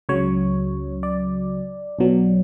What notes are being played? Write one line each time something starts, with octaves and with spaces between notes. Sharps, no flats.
C#2 C#3 F#3 C#5
D5
B1 B2 F#3